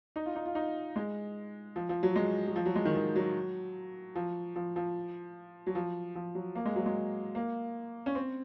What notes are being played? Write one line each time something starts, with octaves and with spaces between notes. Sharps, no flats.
D#4
F4
D#4
F4
D#4
G#3
F3
F3
F#3
G#3
F#3
F3
F#3
G#3
D#3
D#3
F#3
F3
F3
F3
F#3
F3
F3
F#3
A#3
G#3
F#3
G#3
A#3
C#4
C4